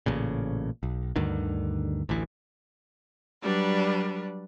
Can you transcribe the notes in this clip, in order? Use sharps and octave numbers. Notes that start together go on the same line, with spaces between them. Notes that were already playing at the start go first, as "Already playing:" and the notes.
A1 A#2 C#3
B1
D2 G2 D3 D#3
A1 D2 E3
F#3 G3 D4 B4